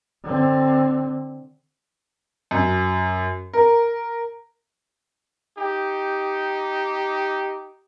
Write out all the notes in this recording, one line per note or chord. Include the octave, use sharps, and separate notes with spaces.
D3 C4
F#2
A#4
D#4 G4